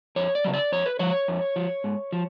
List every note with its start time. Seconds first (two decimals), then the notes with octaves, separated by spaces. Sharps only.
0.16 F2 C#5
0.35 D5
0.44 C#3 F#3
0.54 D5
0.72 F2 C#5
0.86 B4
0.99 F3 C#5
1.28 F2
1.56 F3
1.84 G#2
2.12 F3